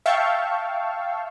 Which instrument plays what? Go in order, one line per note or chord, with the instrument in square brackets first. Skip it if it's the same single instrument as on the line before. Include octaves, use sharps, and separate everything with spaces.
[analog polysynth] E5 F5 G5 A5 C#6